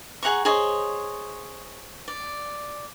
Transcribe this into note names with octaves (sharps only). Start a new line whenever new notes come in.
G#4 F#5 A#5 C#6
G#4 C5 C#5 D#5
D5